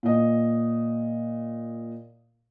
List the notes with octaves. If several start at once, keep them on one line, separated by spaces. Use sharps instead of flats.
A#2 D#5